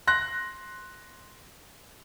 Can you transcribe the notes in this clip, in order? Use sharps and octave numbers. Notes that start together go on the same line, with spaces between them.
C6 F#6 A#6